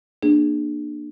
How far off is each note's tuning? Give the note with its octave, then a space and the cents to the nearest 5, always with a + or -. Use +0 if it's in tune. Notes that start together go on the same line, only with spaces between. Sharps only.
A#3 +15 D4 +25 G#4 +0